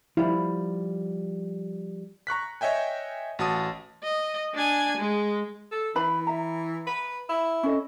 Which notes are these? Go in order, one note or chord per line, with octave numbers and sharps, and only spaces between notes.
F3 G3 E4
A#5 C#6 F#6 B6
C#5 D#5 E5 G5 G#5
A1 F#4 A5 D#6 D#7
D#5
D4 G#5
G#3
A4
E3 E4 B4 B5
E5 A#5
B4
E4
C#4 A4 D#5